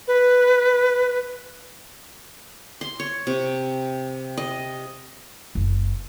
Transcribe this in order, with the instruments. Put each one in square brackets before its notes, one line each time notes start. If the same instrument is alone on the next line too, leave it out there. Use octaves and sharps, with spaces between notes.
[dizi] B4
[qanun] C6
C#5
C3
D#5
[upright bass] F#1